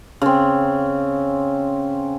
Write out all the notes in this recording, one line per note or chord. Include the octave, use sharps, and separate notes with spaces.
C#3 C4